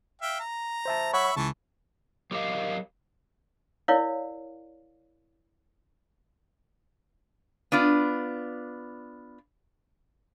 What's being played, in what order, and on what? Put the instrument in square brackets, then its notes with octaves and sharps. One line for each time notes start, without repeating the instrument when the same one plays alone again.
[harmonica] E5 F5 G5
A#5
[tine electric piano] C5 E5 A5
[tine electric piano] C#5 F#5 [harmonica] E5 B5 C#6
[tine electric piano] C#2 C#3 [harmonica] E3 A5 C#6
[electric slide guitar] F#3 G4 A#4 D#5 F5
[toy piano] E4 A#4 C#5 D5 F5
[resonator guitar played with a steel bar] B3 D4 F4